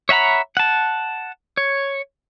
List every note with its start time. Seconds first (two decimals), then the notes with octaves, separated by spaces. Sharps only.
0.09 C#5 E5 F#5 A#5 B5
0.57 F#5 A5
1.57 C#5